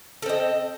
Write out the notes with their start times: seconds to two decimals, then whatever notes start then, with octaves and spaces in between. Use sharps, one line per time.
0.22 A4
0.26 C4
0.29 D#5